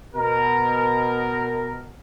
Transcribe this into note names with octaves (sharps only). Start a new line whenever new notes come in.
B2 A#4